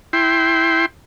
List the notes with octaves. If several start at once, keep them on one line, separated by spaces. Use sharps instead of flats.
E4 G5 C6